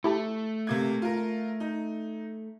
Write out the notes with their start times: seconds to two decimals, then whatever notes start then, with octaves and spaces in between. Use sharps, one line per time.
0.04 A3 E4 G4 A5
0.67 C3 A#3 G#6
1.02 F4 A#4
1.60 D#4